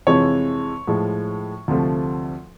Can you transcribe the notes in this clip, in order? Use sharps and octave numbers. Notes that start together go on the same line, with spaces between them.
F2 C3 E3 G#3 C#5
A2 F3 G#3
D2 C3 F3 A3